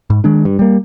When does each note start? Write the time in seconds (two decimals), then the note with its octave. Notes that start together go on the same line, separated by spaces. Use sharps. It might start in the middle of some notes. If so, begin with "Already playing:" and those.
0.10 G#2
0.24 D#3 G#3 D4
0.45 G2
0.59 G3 A#3